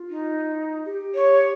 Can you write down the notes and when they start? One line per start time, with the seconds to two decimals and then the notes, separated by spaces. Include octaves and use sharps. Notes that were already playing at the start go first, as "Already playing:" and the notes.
Already playing: F4
0.10 D#4
0.85 G4
1.15 C#5